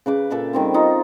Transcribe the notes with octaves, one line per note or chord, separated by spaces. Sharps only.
C#3 B4 D6
A#2 A4 E5 B5
D#3 G3 C4
D#4 F4 A4 D#5